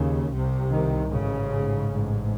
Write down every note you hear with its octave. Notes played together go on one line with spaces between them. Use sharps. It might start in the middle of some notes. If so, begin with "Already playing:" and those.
Already playing: D#2 C#3
C2 C3
D#3
A1 G#2 C#3
A1 G#2